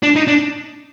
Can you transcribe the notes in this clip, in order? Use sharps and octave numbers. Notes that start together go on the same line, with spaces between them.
D4
D#4
D4